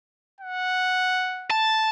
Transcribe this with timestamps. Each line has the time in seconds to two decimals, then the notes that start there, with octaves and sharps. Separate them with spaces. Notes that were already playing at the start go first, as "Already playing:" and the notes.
0.41 F#5
1.50 A5